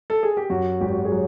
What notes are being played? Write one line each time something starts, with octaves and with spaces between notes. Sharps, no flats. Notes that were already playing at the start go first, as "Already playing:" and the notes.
A4
G#4
G4
F#2 F#4
G#1 G4
G#4
F#3